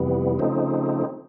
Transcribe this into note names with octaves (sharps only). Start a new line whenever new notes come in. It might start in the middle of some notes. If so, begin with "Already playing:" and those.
Already playing: F2 C3 E3 G3 B3
C#3 F3 A3 C4 D#4